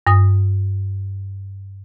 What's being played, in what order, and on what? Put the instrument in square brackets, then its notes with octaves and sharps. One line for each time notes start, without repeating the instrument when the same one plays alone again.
[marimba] G2 D#6